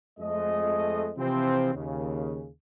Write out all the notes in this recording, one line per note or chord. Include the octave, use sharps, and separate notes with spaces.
F2 G#3 A3 D#5
C3 E3 F3 C4
D#2 C#3